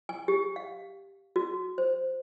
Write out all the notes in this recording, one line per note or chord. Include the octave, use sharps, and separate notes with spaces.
G#5
G4
F5
F#4
C5